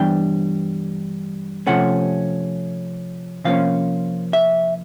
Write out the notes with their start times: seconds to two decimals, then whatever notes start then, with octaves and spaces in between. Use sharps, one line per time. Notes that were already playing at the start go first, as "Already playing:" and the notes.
Already playing: G2 E3 G3 B3 D4 G5
1.67 C3 F3 A3 C#4 F#5
3.45 C3 F3 A#3 C#4 F5
4.33 E5